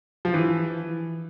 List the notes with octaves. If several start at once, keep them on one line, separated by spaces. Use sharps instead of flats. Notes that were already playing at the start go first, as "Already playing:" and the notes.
F3
E3